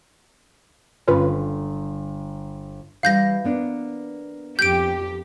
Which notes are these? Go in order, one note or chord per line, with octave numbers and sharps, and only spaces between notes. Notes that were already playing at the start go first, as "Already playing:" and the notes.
G1 C#4 F4 B4 C6
E3 G3 F5 G6 A#6
A#3 B3 D4
F2 G4 G6 D7